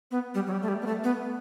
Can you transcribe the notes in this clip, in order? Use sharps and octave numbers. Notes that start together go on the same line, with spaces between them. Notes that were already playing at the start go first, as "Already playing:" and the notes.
B3
G3
F#3
G3
A3
G3
B3
A3
B3